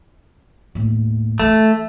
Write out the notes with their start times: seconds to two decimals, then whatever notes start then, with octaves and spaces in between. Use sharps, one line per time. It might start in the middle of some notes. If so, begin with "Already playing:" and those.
0.75 D#2 A2
1.40 E3 A3